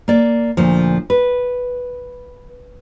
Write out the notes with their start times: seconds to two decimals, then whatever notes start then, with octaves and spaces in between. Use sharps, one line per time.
0.08 A#3 D5
0.57 D2 A#2 F3
1.10 B4